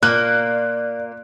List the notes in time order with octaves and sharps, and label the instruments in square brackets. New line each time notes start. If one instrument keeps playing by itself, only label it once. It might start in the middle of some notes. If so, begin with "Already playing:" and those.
[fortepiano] A#2 [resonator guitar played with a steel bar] A#3 [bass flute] D5 [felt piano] F#6